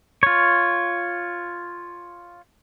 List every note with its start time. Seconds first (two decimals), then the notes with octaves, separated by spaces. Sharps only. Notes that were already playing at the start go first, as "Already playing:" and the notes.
0.23 F4 C#5